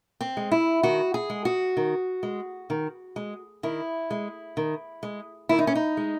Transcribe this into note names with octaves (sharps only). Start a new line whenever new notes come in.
C4
G#3
E4
D#3 F#4
G#4
G#3
F#4
D#3
G#3
D#3
G#3
D#3 E4
G#3
D#3
G#3
D#3 E4
D#4
C#4
D#4
G#3